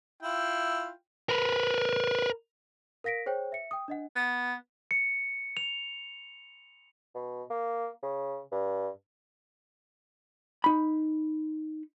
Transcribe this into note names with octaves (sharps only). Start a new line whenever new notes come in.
E4 F4 G5
A#4 B4
A#4 F5 A#6 B6 D7
G#4 C5 C#5 G5
E5 C#7
G5 D#6
D4 D#5 F#5
B3
C#7
F7
B2
A#3
C#3
G2
D#4 B5